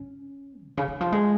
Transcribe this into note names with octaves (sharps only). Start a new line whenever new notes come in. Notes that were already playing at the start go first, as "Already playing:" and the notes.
Already playing: C#4
A#2
C#3
D#3
F3
G#3